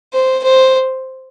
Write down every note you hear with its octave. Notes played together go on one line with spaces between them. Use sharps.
C5
C5